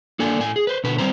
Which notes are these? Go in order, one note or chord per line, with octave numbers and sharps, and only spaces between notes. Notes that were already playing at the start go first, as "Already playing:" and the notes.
A#3 D4 A4 D5 G#5
A2 A3 G#5
G#4
B4 C5
B2 D3 B4
G3 C4 C5 A#5